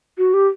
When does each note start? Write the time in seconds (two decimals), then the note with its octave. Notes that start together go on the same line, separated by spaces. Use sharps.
0.18 F#4
0.34 G4